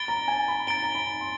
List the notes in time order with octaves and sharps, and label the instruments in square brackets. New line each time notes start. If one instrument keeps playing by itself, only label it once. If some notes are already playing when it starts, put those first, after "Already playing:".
Already playing: [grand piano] B5 [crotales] A6 D7 G7
[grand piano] A#5
G#5
B5
[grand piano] A#5 [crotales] A6 D7 G7
[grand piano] A#5
B5
C6